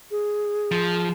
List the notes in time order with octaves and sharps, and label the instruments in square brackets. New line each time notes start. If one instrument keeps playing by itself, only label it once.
[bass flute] G#4
[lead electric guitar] F3